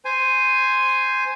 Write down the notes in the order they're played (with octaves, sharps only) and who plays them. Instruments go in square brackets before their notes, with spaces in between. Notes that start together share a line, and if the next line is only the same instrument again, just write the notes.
[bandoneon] C5 G#5